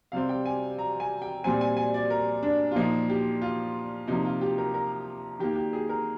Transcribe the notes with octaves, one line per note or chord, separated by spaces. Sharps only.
C3 G3 C4 F5
G5
G#5
A#5
G#5
G5
A#2 G3 C4 G#5
G#5
G#5
D5
A#4
D4
F4
A#2 F3 A#3 D#4
G4
F4
C3 F3 A#3 D#4
F4
G4
A#4
A#4
D#3 A#3 G4
G4
G#4
A#4